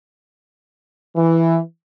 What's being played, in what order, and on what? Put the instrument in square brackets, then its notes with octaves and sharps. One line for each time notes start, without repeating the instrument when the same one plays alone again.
[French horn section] E3